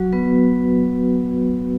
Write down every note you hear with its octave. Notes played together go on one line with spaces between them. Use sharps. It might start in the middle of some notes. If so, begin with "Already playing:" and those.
Already playing: F#3 F#4
B3 B4